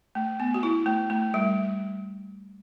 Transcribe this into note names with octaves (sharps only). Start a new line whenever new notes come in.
A3
B3
F#4
E4
A3
A3
G3